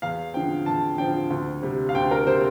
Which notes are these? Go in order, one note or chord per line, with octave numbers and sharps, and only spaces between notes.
E2 F5
D3 F3 C4 G5
E2 A5
D3 F3 C4 G5
D2
C3 G3
F5
D2 G5
A#4
C3 G3 C5